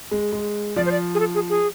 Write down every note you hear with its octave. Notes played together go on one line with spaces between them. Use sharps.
G#3
G#3
F3 D5
C5
D5
G#4
A4
G#4
G#4